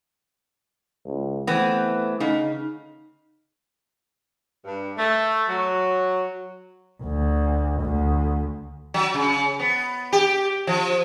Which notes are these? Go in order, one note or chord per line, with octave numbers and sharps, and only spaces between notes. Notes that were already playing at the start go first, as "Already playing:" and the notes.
C#2
E3 A3 B3 C4
C#3 D#4
G2
A3
F#3
D2
D2
F#3
C#3
B3
G4
F3